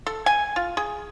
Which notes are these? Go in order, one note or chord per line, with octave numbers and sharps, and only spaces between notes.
A4
G#5
F4
G#4